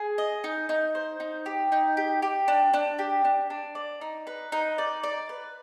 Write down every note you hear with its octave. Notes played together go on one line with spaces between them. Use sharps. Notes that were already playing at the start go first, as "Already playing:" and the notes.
Already playing: G#4
D#5
D#4
D#4
C5
D#4
G4
D#4
G4
G4
D4
D4
G4
D4
D4
D5
D#4
B4
D#4
D5
D5
B4